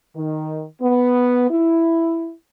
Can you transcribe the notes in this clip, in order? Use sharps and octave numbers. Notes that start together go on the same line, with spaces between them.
D#3
B3
E4